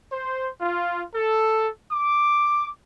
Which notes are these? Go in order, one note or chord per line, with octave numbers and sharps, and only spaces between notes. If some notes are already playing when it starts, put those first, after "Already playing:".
C5
F4
A4
D6